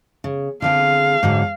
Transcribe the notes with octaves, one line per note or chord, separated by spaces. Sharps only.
C#3
D3 C4 G#4 F5
G#2 D3 F#3